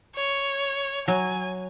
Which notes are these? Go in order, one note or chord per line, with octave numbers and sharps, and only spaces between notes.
C#5
F#3 G#5